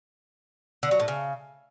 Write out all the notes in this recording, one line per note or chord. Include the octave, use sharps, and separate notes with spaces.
D3
F#3
A2
C#3